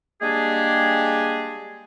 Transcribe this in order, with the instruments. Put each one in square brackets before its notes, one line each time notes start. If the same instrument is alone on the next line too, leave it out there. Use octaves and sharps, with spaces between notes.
[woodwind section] G3 G#3 A#3 D4 G4 G#4